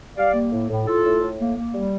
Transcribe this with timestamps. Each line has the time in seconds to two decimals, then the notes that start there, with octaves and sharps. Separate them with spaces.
0.17 G3 D5 F5
0.34 A#3
0.52 A2
0.69 A2
0.87 A2 F4 A4
1.04 A2
1.22 A2
1.39 A#3
1.57 A#3
1.74 G3